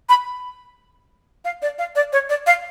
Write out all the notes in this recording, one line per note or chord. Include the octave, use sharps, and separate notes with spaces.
B5
F5
D5
F5
D5
C#5
D5
F5